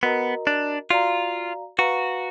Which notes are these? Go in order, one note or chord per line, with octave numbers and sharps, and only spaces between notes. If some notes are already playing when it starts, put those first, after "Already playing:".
B3 F#4 A#4 D#5 A#5
D4
F4 F#4 D5 F5 A#5
F#4 B4 F5 A#5